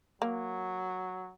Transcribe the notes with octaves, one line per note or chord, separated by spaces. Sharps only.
F#3 A#3